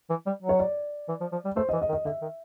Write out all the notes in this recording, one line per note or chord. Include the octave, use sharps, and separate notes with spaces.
E3
G3
F#3
C#5
D5
E3
F3
F3
G3
A3 C5
D#5
E3
D#5
D#3
D#5
D3 E5
D#3